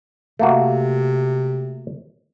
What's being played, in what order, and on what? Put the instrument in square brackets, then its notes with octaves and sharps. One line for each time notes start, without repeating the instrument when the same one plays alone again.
[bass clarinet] C3 [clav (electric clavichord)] A3 A#3 F#4